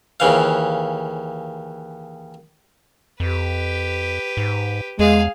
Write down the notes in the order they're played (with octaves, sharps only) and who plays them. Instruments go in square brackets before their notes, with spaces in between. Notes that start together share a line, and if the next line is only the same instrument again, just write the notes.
[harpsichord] D#2 C#3 E3 F5
[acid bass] F2 [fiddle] G4 B4
[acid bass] G#2
[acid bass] E2 [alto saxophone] G#3 [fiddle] G#4 F5